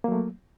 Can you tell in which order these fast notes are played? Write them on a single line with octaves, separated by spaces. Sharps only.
A#3 F#3 A3